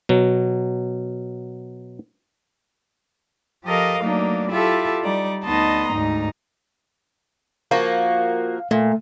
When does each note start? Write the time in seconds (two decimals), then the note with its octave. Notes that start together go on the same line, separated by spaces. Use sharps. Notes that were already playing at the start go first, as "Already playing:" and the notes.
0.09 B2 F#3
3.63 F3 G4 A4 A#4 D#5 F5
3.98 F#3 A3 A#3 D4 D#4
4.49 E4 F4 G4 A4 E5
5.02 G3 D#4 D5
5.44 D2 B3 D#4 D#5 A5 C6
5.87 D2 G#2 D#4 A#5
7.71 F3 A#3 F#4 F5
8.71 A#2 A3